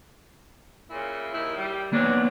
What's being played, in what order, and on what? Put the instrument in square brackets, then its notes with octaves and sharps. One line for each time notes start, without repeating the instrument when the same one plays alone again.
[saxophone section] A#2 C#3 E4
D#2 D#3 E4
G3
[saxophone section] F#3 D4 [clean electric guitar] A#3 B3 C#5